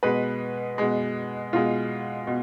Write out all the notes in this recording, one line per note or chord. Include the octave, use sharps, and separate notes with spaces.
B2 G#3 B4
B2 G#3
B2 G#3 F4
B2